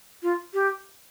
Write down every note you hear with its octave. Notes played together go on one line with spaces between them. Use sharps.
F4
G4